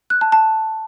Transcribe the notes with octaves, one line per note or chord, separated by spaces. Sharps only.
F#6
A5
A5